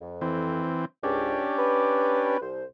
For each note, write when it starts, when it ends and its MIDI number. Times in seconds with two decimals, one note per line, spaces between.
0.01 0.70 41
0.21 0.85 52
0.21 0.85 60
1.03 1.41 37
1.03 1.41 44
1.03 2.37 61
1.03 2.37 62
1.03 2.37 67
1.58 2.39 71
2.42 2.65 36
2.42 2.65 72